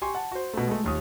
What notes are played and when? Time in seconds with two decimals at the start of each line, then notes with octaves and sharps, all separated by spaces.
0.02 G4 G#5 C6 C#6
0.15 F#5 A5
0.32 F#4 C5
0.54 B2 A3
0.68 G#3 A3
0.84 D#1 D#2 D#6